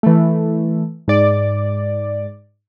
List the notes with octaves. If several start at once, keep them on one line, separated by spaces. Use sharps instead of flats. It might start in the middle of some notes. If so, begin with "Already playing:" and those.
E3 A3
G#2 D5